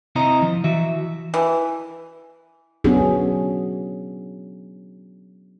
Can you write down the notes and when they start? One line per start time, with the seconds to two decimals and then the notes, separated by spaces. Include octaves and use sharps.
0.15 C3 C4 E4 C5 D#5 A#5
0.42 F3
0.64 E3 F#4 E5
1.34 E3
2.84 F#3 B3 C#4 D4 F#4 G#4